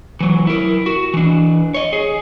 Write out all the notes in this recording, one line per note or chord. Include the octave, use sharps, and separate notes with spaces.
E3 F#3
E4 A#4
F#4
E3 D4
C#5 D#5
G#4